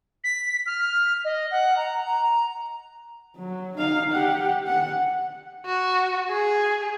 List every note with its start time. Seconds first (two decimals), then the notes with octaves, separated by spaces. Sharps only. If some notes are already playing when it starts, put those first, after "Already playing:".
0.24 B6
0.66 F6
1.25 D#5
1.51 F#5
1.77 A#5
2.00 A#5
3.37 F#3
3.77 D#4 F5
4.12 G4 F#5
4.67 F#5
5.66 F#4
6.31 G#4